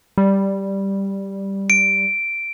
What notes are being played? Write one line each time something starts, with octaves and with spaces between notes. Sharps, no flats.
G3
D7